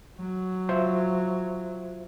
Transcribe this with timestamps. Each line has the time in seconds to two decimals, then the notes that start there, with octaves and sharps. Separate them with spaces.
0.19 F#3
0.69 F4 C5 E5